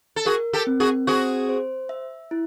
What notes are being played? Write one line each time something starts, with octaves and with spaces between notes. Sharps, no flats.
A4
F#4 G#4 A#4
G4 A4
C4
F#4 G#4
F#4 G#4 C5
C5
E5
E4